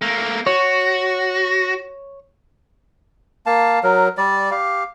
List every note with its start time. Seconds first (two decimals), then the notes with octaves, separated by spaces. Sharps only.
0.02 A3 A#3
0.47 F#4 C#5
3.46 A#3 F5 A5
3.83 F#3 A#4
4.18 G3 D5
4.51 G4 F5